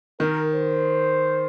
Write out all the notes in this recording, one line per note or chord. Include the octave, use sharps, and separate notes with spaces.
D#3 A#4
C5